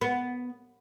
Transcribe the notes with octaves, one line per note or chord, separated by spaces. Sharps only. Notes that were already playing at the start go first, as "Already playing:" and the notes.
B3